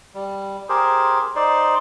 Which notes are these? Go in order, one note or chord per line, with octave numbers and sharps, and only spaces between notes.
G3
G4 G#4 A#4 C5
D#4 C5 D5 C6